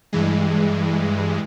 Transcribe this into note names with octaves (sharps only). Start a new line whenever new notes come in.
G2 E3 G#3